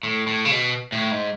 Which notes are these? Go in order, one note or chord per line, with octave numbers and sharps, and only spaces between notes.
A2
A2
C#3
B2
A2
G#2